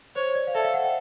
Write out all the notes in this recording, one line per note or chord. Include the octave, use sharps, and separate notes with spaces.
C5 C#5
D5
F5
A4 E5
F5
F#5
G5